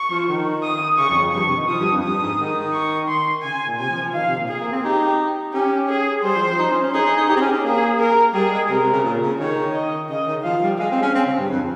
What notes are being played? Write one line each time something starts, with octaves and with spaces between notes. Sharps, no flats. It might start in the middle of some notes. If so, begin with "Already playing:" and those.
Already playing: C#6
F3
D#3
D#6
C#3 C#6
F2
F2
G2 C#6
C3
D#3
F3 D#6
G2
F2
G2 D#6
G#2
D#3
C#6
C6
C#3 G#5
A#2
C3 G#5
F3
F3
D#3 F5
C3
A#2
G#4
A#3
C4
D#4 G4
C#4 G4
G#4
G3 C5
F3
F3
D#4
C#4
C#4
D#4 G#4
D#4
D#4
D#4 G4
C4
C#4
C#4
A#3 G#4
A#4
G3 G#4
G#3
C3 A#4
C3
C#3
A#2
C#3
D#3 C#5
D#5
C#3 D#5
D#3
F3 F5
G3
G#3 F5
C4
C#4
C4
C#3
G2
F2